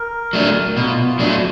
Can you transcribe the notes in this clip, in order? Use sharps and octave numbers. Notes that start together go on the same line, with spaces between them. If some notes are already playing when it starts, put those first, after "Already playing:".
Already playing: A#4
F#3 A3 D4
B2 E4
F4
E4
F4
F#3 A3 D4 E4
F4
E4